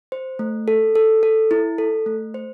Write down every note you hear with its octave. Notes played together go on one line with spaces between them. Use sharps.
C5
A3
A4
A4
A4
E4
A4
A3
C5